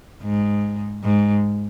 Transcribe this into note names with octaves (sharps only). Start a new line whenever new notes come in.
G#2
G#2